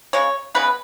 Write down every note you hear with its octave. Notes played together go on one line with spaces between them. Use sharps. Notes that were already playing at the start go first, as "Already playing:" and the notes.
C#3 G#3 C#5
C#3 G#3 B3 B4